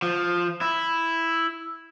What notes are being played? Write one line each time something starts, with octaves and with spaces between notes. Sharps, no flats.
F3
E4